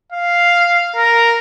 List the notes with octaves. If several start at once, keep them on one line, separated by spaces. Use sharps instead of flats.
F5
A#4